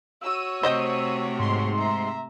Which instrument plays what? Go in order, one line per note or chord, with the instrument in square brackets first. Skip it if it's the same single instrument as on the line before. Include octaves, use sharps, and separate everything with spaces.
[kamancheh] F#4 C#5 [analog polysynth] E6 D#7
[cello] C3 A3 [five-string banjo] C5 D#5 G5
[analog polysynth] G#2 C6
[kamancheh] E5 A#5